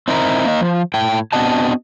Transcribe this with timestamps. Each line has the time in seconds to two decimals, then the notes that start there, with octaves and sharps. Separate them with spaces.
0.08 C4 D#4 E4 A#4
0.45 A#3 D#5
0.61 F3
0.94 A2 G5
1.32 B3 C4 D4 F#4 D#5 A5